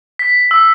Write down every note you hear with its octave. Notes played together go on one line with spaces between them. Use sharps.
B6
E6